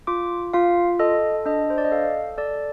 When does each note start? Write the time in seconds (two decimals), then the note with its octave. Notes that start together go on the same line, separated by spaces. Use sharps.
0.07 F4 D6
0.53 F4 F5
0.99 A4 D#5
1.46 D4 D#5
1.70 C5
1.78 D5
1.85 D#5
1.91 A4 F5
2.38 A4 D5